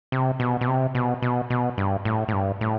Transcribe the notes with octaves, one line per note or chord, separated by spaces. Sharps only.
C3
B2
B2
C3
B2
B2
B2
G2
A2
A2
G2
A2